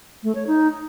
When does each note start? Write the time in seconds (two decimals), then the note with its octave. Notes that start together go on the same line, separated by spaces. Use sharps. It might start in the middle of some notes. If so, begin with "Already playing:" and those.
0.23 A3
0.35 C#5
0.47 D#4